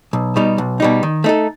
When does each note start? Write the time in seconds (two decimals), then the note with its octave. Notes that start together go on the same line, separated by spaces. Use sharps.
0.13 B1
0.36 B2 G3 D#4
0.58 B1
0.80 B2 G3 D#4
1.03 D#3
1.24 A3 D#4 A4